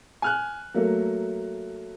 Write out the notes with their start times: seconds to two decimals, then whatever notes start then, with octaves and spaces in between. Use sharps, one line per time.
0.22 G#5 F6 F#6
0.74 F#3 A3 A#3